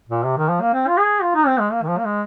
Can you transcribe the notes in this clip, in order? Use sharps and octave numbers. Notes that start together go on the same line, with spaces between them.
A#2
C3
D#3
F3
A#3
C4
F4
G#4
F4
D#4
C4
G#3
A#3
D#3
F3
A#3
G#3